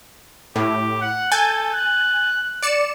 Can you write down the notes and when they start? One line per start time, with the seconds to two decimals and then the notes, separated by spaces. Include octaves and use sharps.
0.56 A2 G4
1.01 F#5
1.32 A4 G#5 G6 A6
1.74 F#6
2.63 D5 C#7 E7